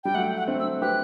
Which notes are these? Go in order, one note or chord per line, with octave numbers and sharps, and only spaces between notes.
G3 G5
F#3 A3 F#5
F#5
A3 C4
E6
G4 B4 F#6